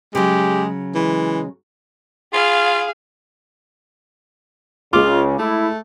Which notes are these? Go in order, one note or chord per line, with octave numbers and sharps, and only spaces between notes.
C#3 F#3 G#3 G4
E3 G#3
F4 G#4 F5
C#2 C#3 G#3 F4 D6
A3 E4